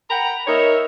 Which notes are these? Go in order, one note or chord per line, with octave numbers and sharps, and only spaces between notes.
F#5 G5 A#5 B5
D#4 A#4 C#5 E5